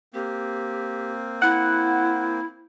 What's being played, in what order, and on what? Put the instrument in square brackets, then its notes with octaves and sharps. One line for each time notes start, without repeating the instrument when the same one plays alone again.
[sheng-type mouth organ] A#3 C4 [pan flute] G4
[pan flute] E4 [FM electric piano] F#5